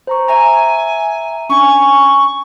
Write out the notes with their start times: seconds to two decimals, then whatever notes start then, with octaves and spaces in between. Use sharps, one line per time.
0.07 C5 A#5 C#6
0.28 E5 G#5 A#5
1.49 C#4 D4 G#5 C#6